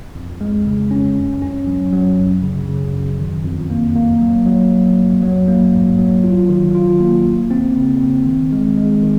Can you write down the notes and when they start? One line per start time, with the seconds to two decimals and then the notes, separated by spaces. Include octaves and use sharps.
0.15 F2
0.41 G#3
0.66 C#3
0.91 C#4
1.16 F#2
1.42 C#4
1.67 F#3
1.93 F#3
2.18 F#2
2.43 C#3
2.68 C#3
2.94 F#2
3.19 D#3
3.44 F2
3.70 A#3
3.95 A#3
4.21 F#3
4.46 F#3
4.72 F#3
4.97 F2
5.22 F#3
5.48 A#3
5.73 G#2
5.98 F#3
6.24 F4
6.49 D#3
6.75 F4
7.00 A#3
7.25 D#2
7.51 C4
7.76 C#3
8.01 C4
8.27 D#3
8.52 G#3
8.78 G#3
9.03 D#3